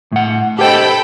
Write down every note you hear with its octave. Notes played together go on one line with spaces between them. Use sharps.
A2 F#5
G4 A4 C5 D#5 G5 B5